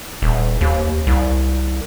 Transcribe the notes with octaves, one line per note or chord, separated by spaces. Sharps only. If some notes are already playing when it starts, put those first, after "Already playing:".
D#1
D#2
C2